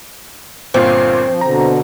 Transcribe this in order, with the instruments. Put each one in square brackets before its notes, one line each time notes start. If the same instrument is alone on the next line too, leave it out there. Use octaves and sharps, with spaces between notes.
[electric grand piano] G1 A#2 F4 [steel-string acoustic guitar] C4
[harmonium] F3
[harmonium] B2 D3 [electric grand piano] A#5